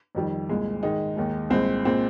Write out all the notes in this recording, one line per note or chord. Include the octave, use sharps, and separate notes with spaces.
F2 D#3 G3
C2 A#2 G#3
G#2 D#3 G#3 D#4
D#2 D#3 G#3
C2 A#2 G#3 C4
A#2 G#3 C4